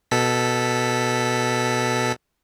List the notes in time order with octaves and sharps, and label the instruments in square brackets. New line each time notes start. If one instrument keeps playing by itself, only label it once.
[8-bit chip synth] B2 A4 B6